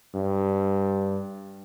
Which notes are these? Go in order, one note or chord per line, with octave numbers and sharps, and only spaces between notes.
G2